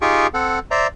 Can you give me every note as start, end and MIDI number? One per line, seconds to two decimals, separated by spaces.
0.02 0.27 63
0.02 0.27 65
0.02 0.27 67
0.02 0.27 68
0.02 0.27 79
0.02 0.27 85
0.34 0.59 60
0.34 0.59 69
0.34 0.59 78
0.71 0.87 72
0.71 0.87 74
0.71 0.87 76
0.71 0.87 82